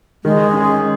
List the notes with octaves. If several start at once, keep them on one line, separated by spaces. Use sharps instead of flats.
D#3 G#3
C#4 G#4